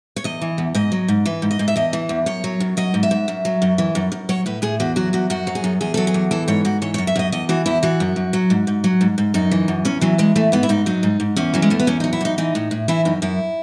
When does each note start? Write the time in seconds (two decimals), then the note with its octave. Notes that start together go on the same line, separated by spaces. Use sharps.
0.16 C#5
0.24 E2 D#5
0.42 E3
0.58 E2
0.75 G#2 D#5
0.92 F#3
1.08 G#2
1.25 E3 B4
1.42 G#2
1.51 D#5
1.59 G#2
1.68 E5
1.76 E2 D#5
1.93 E3
2.09 E2
2.26 F#2 C#5
2.44 F#3
2.60 F#2
2.77 F#3 D#5
2.94 G#2
3.03 E5
3.11 G#2
3.28 F#2
3.45 F#3
3.62 F#2
3.78 E3
3.95 F#2
4.12 F#2
4.29 F#3 C#5
4.46 A2 B4
4.62 A2 G#4
4.80 E2 F#4
4.96 F#3 F#4
5.13 E2 F#4
5.30 F#2 F#4
5.47 F#3
5.55 G#4
5.64 F#2
5.81 E2 G#4
5.94 F#3 A4
6.07 G#4
6.14 E2
6.31 E3 A4
6.48 G#2 C#5
6.65 G#2 F#4
6.82 E3 C#5
6.94 C#5
6.98 F#2
7.07 E5
7.16 F#2 D#5
7.32 E2 D#5
7.49 E3 F#4
7.66 E2 E4
7.83 E3 F#4
8.00 F#2
8.16 F#2
8.33 F#3
8.50 G#2
8.67 G#2
8.84 F#3
9.01 G#2
9.18 G#2
9.34 F#2 D#4
9.51 E3
9.68 F#2
9.85 E2 C#4
10.01 E3 F#3
10.18 E2 G#3
10.36 E3 A3
10.52 G#2 B3
10.63 E4
10.69 G#2 D#4
10.86 F#3 D#4
11.03 G#2
11.20 G#2
11.36 E2 C#4
11.54 E3 F#3
11.62 G#3
11.70 E2 A3
11.80 B3
11.87 E2 C#4
12.00 F#3 D#4
12.13 E4
12.21 E2 D#4
12.38 E3 D#4
12.55 A2
12.71 A2
12.88 E3 E4
13.05 F#2 D#4
13.22 F#2 E4